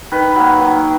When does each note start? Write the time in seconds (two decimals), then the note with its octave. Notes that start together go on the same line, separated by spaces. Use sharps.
0.12 D#3 B4
0.36 F#3 A#3
0.60 D#3